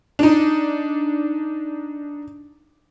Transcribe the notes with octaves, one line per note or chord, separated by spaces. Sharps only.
D4 D#4